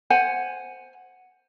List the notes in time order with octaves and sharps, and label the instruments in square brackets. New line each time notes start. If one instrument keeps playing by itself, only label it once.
[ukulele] C5 F#5 G#5